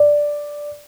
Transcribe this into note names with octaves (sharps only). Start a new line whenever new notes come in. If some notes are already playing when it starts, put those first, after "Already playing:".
Already playing: D5